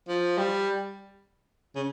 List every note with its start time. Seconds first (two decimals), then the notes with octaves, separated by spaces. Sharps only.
0.08 F3
0.38 G3
1.75 C#3